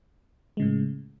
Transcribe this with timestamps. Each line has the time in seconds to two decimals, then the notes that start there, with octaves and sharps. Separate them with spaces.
0.57 G#3
0.60 C#3
0.62 A2